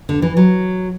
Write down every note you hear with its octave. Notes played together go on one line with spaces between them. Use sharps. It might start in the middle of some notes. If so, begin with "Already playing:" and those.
D3
E3
F#3